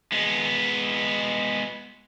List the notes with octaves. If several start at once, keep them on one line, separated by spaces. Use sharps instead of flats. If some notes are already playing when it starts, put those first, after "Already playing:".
G#3 B3